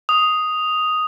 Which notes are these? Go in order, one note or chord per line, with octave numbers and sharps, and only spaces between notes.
D#6